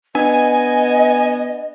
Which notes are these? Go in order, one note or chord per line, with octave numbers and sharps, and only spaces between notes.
B3 D4 D#5 G#5